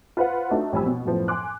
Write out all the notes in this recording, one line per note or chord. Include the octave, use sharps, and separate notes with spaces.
F4 B4 C5 F5 F#5
A3 D4 D#4 F#4
A1 F3 G3 G#5 B5 E6
B2
F#2 A2 F3 B3
G#5 C6 D6 F#6